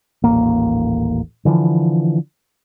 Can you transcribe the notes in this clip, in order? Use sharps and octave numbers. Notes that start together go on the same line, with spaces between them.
D#1 A1 A#3
D3 E3 F3